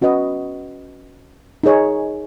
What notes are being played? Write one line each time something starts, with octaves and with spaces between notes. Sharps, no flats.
C#4 F#4 B4 D#5
D#4 G#4 C#5